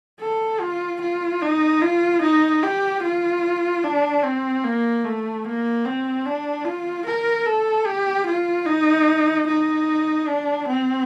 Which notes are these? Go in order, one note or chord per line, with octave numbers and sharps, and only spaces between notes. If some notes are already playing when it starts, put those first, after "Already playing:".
A4
F4
F4
D#4
F4
D#4
G4
F4
D4
C4
A#3
A3
A#3
C4
D4
F4
A#4
A4
G4
F4
D#4
D#4
D4
C4